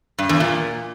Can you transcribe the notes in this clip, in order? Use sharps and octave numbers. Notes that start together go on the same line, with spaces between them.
G2
E2
A#2